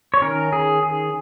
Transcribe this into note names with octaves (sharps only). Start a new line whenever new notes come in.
C#5
D#3 C#4 A#4
G#4
G#4